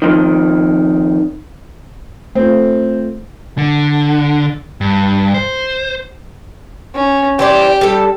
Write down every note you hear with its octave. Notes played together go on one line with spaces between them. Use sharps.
F2 D#3
A3 C4 F4
D3
G2
C5
C#4
E3 G4 C5 D5
G3 A4